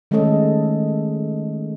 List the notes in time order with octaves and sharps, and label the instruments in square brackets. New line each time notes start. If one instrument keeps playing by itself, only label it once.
[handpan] D#3 G#3 A3 C#4 A4 D#5